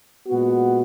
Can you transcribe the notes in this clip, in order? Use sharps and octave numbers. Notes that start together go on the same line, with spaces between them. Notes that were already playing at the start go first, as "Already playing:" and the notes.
A#2 G#3 B3 F#4